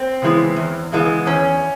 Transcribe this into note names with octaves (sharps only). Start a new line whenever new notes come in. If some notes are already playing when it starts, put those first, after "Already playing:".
Already playing: C4
C#3 E3 G#3 B3
E2
C#3 E3 G#3 B3
E2 C#4